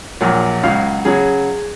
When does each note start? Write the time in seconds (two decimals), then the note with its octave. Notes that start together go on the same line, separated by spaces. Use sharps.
0.21 A#1 A#2 F#3
0.63 C#2 C#3 F#3 F5
1.05 C#3 F#3 G#4